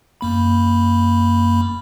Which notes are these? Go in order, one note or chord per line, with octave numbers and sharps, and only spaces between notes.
F#2 A#3 B5